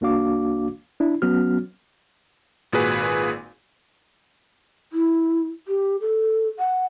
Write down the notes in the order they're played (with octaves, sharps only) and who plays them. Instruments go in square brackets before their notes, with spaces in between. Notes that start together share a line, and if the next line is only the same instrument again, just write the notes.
[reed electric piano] C2 A#3 D4 F#4 F5 D6
D4 E4
F#3 B3 C#4 F#4 F6
[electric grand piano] G#1 A#2 F#4 G#4 B4 G#5
[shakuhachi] E4
G4
A4
F#5